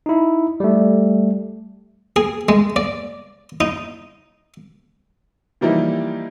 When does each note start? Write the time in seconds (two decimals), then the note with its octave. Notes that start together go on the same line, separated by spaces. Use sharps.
0.06 D#4 E4
0.60 G3 A3
2.16 G#4
2.49 G#3
2.76 D5
3.61 D#4
5.61 E3 F3 G3 A#3 D#4 E4